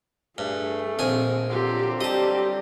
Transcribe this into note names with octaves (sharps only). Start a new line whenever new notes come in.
G2 A3 G#4
A#1 D#3 C4 G#5
D3 F#3 C4 F4 G4
G3 G4 D#5 A5